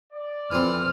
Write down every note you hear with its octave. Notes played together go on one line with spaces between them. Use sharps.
D5
F2 E3 C4 F6